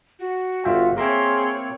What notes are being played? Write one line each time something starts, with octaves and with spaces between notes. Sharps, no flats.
F#4
G1 F4 E5 G5
A#3 C4 G#4 A#4 C#5 E5 C6